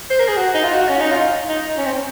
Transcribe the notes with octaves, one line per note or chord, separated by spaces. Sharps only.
C5
A#4
G#4
F#4
D#4
F4
F#4
C#4
D#4
F4
D#4
C#4
C4